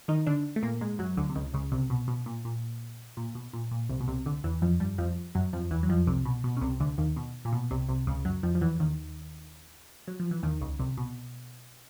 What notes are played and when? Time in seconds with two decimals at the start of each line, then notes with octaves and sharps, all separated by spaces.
0.08 D#3 D#4
0.26 D3 D4
0.56 A3
0.63 A#2 A#3
0.81 G#2 G#3
0.99 F#2 F#3
1.17 D2 D3
1.29 C3
1.35 C#2 C#3
1.53 C#2 C#3
1.72 C2 C3
1.90 B2
2.08 B2
2.26 A#2
2.45 A#2
3.17 A#2
3.35 B2
3.53 A#2
3.71 A#2
3.89 C2 C3
4.00 B2
4.08 C2 C3
4.26 D2 D3
4.44 E2 E3
4.62 F2 F3
4.80 G2 G3
4.98 F2 F3
5.35 F#2 F#3
5.53 F2 F3
5.71 E2 E3
5.83 F#3
5.89 F2 F3
6.07 C2 C3
6.25 B2
6.44 B2
6.57 C#3
6.61 C2 C3
6.80 D2 D3
6.98 D#2 D#3
7.16 B2
7.45 A#2
7.53 B2
7.71 C2 C3
7.89 C2 C3
8.07 C#2 C#3
8.25 F#2 F#3
8.43 F2 F3
8.55 F3
8.61 E2 E3
8.80 D#2 D#3
10.07 F#3
10.20 F3
10.31 E3
10.43 D#2 D#3
10.61 C#2 C#3
10.79 C2 C3
10.97 B2